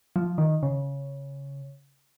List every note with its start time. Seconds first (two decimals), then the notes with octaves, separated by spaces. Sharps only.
0.16 F3
0.38 D#3
0.63 C#3